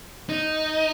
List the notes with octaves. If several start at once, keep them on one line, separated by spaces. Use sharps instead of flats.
D#4